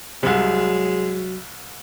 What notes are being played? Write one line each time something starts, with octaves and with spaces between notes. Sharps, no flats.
C2 C3 F#3 G#3